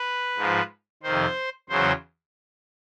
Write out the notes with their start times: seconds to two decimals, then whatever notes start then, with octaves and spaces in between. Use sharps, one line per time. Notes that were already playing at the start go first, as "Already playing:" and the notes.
Already playing: B4
0.37 G#2 F3
1.03 F2 C3 D#3 C5
1.69 E2 C#3 F#3 C5